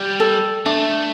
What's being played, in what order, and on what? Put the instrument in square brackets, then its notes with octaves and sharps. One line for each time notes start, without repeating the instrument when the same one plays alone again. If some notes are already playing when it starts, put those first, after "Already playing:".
Already playing: [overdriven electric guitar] G3
[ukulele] A4
[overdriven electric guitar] A3 [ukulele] D4